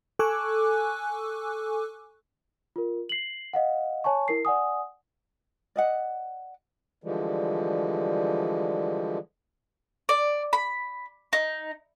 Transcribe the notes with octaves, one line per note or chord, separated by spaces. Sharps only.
A4 G#5 C#6 D6 E6 F#6
F4 A#4
C7 F#7
D#5 F5 F#5
C#5 G#5 A5 C#6
E4 A#4 C7
D5 F#5 G#5 D#6
D5 D#5 F#5
D3 E3 F3 G3 G#3
D5
B5
D#4